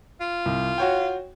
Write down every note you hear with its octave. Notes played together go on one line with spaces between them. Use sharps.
F4
C2
F#4 C#5 G5